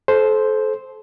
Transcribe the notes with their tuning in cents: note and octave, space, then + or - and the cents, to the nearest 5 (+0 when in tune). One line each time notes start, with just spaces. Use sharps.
A4 -30 C5 +0